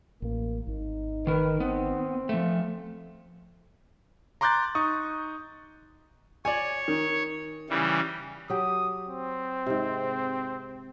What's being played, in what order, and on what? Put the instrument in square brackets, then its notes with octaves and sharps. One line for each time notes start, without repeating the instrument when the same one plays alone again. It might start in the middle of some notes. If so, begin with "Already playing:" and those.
[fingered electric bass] A1 [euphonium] A#3
[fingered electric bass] G#1 [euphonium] D#4
[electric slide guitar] D#3 A#4 [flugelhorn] B4
[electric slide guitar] B3 [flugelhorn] C4
[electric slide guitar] F3 A3
[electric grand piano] A#5 C6 D6 F#6 G6 A6
D#4 C#6 D#6
[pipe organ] C#5 [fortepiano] D5 G#5
[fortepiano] D#3
[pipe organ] C#3 E3 G3
[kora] F#3 G4 [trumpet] D#6
[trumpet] C4
[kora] G#2 C3